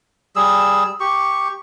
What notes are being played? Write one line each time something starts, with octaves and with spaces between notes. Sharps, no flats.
G3 G#4 E6
G4 C#6